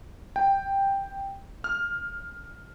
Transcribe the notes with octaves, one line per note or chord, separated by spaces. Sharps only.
G5
F6